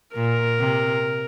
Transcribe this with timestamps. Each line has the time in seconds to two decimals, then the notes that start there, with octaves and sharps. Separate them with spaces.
0.15 A#2 A#4
0.60 C3